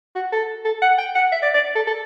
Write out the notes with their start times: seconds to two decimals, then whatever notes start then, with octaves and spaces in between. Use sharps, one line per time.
0.15 F#4
0.32 A4
0.65 A4
0.82 F#5
0.98 G5
1.15 F#5
1.32 E5
1.43 D5
1.54 D5
1.75 A4
1.87 A4